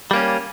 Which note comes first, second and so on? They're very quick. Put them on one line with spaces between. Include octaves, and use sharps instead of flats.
G3 A#3 C#4